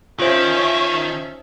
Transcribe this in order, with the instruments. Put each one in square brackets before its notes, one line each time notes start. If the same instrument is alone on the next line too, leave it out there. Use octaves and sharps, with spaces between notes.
[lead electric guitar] D#3 [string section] C#4 E5 A5 [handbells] F4 C5